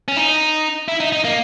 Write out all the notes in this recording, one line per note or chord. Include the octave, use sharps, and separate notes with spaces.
C#4
D#4
E4
D#4
D#4
A#3